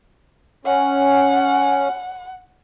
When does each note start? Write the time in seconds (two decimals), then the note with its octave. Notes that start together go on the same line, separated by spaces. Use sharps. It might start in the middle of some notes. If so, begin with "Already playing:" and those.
0.65 C#4 F#5